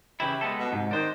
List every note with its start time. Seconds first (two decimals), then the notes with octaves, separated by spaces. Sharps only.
0.20 C#3 E3 E4 G4
0.41 G#3 B3 A4
0.59 B2
0.72 G#2 C3
0.91 D#3 D4 C5